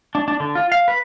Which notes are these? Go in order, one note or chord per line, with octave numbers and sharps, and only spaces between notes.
D4
D4
D3
F4
F5
B4